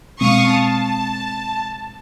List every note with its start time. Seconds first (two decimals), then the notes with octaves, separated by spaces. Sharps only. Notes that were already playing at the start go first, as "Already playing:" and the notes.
0.21 B2 G#3 C4 F5 C#6 D#6
0.51 A5